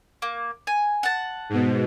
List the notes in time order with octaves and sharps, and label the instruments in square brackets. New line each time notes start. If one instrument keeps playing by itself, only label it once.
[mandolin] A#3
G#5
F#5 A5
[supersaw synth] G#2 B2